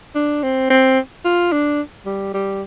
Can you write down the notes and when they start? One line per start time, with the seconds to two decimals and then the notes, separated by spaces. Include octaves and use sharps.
0.15 D4
0.43 C4
0.70 C4
1.25 F4
1.52 D4
2.06 G3
2.34 G3